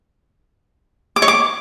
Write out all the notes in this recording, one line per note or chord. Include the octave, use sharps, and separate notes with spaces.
D6
C#5
D6